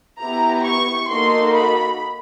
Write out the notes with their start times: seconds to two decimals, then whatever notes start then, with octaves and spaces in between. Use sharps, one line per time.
0.21 B3 E4 G4 A#5
0.65 C#6
1.08 A#3 D#4 F#4 A4 C6
1.53 B5